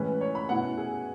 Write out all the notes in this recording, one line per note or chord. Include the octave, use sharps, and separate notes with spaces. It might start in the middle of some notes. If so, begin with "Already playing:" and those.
Already playing: A2 E3 G#3 C#4 B4
C#5
B5
B2 A3 C#4 E4 F#5
G#4